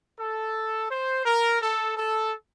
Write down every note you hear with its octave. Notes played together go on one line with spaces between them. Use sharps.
A4
C5
A#4
A4
A4